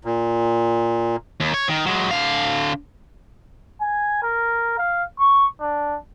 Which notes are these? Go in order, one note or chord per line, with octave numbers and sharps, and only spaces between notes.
A#2
D#2
C#5
D#3
F#3 G#3
D3 F5
G#5
A#4
F5
C#6
D4